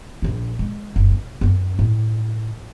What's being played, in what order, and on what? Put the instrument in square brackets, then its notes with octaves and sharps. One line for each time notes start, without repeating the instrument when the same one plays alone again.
[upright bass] A#1 F4
G#3
F#1
B2
F#2 B3
A2